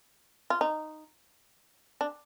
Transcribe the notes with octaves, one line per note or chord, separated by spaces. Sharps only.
F4
D#4
D4